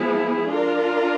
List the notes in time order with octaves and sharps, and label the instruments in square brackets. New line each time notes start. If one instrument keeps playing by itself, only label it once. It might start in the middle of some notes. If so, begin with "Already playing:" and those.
Already playing: [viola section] F3 G#3 B3 E4 G#4
D4 F4 A#4